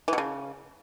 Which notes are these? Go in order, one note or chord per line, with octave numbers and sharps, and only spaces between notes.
E3
B2
C#3